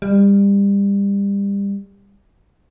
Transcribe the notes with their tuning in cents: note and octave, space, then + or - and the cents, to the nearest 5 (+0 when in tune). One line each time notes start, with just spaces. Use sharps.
G3 +30